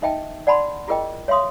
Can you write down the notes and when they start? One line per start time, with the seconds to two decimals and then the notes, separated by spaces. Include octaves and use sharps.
0.02 D#4 D#5 E5 G5 A5
0.47 D5 F#5 A5 B5 C6
0.88 E4 F4 G#4 A#4 D#5 G5
1.28 C#5 E5 F5 C6 D#6